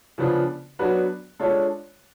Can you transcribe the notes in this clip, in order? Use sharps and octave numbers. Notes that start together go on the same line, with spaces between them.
C#3 F3 B3 D4 F4
F#3 B3 D4 F#4 B4
G#3 D4 F4 A4 C#5